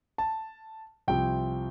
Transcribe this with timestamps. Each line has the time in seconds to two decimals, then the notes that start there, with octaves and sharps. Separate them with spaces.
0.18 A5
1.08 C2 C3 F3 C4 G5